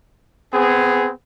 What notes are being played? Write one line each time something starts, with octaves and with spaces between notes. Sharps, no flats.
B3 C4 G#4